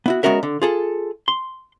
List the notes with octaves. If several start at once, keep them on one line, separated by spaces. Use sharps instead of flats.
B3 E4 F#4
G#3 B3 C#4 F#4 A#4 E5
D3
F4 G#4 A4
C6